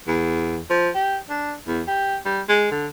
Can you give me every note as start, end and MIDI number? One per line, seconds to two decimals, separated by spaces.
0.07 0.58 40
0.70 0.89 53
0.95 1.17 67
1.29 1.55 62
1.67 1.82 40
1.88 2.16 67
2.25 2.41 55
2.48 2.68 56
2.71 2.87 50